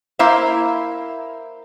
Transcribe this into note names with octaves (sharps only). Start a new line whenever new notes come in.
A#3 E4 C5 E5 F5